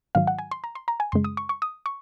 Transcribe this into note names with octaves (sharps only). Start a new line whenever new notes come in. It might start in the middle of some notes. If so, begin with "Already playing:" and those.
G#2 D#3 F#3 F5
F#5
G#5
C6
A#5
C6
A#5
G#5
F#2 C#3 G#3 C6
D#6
C#6
C#6
D#6
C#6